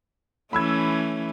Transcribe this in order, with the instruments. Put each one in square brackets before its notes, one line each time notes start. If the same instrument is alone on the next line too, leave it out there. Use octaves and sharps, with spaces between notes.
[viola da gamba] E3 A3 C#4 [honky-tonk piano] B5 E6 G#6